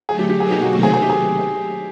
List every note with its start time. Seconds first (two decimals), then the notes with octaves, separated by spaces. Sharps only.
0.08 D3 F#3 A3 G#4
0.19 G4
0.30 G4
0.40 B2 F#3 A#3 D#4 G#4
0.51 G4
0.62 F#4
0.72 C3 D#3 F#3 A3 C4 F#4
0.83 G#4
0.94 G#4
1.02 G4
1.10 G#4